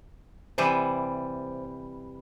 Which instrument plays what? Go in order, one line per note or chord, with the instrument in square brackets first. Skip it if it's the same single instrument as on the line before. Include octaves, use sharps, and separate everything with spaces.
[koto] C3 E3 G3 [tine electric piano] C5